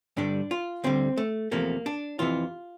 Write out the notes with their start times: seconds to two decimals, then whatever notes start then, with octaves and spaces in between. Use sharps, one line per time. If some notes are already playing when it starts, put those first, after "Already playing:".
0.17 G2 D3 G3 D4
0.51 F4
0.84 D2 D3 G3 C4
1.17 A3
1.52 E2 C3 F3 A3 A#3
1.86 D4
2.19 F2 C3 E3 F4